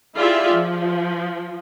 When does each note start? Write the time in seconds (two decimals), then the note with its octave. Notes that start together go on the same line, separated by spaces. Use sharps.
0.15 E4 F4 G4 G#4 D5 E5
0.53 F3